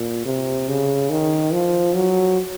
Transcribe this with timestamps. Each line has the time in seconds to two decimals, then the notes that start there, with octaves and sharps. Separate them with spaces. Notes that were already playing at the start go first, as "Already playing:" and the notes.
Already playing: A#2
0.25 C3
0.68 C#3
1.10 D#3
1.53 F3
1.95 F#3